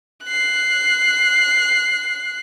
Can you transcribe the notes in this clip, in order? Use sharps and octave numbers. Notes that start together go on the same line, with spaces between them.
F#6 C7